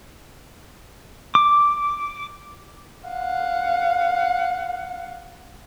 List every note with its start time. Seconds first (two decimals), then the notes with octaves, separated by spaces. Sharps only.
1.35 D6
3.09 F5 F#5